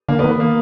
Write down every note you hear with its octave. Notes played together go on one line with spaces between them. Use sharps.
D3 A#3
B3
D#3
B3
A#3